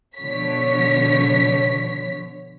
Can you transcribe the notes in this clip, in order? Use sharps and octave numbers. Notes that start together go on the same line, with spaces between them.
B2 D3 F3 C#5 B6